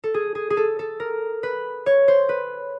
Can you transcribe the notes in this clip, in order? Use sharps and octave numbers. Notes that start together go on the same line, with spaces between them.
A4
G#4
G#4
G#4
A4
A4
A#4
B4
C#5
C5
B4